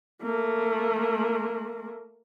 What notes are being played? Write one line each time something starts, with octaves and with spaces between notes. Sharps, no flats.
A3 A#3